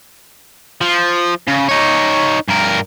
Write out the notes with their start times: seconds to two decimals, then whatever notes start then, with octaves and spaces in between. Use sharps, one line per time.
0.81 F3
1.48 C#3
1.69 D#4 C#5
2.48 G2 A#4